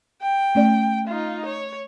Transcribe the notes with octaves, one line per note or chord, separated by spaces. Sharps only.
G5
A3 C#4 D5
D#4 F4
C#5